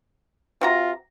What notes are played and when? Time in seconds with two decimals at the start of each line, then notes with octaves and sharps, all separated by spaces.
0.61 C3 F4 F#4 A#5